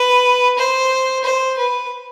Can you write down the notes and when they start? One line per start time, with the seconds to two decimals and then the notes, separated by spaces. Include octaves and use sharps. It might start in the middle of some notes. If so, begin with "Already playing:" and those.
Already playing: B4
0.59 C5
1.24 C5
1.58 B4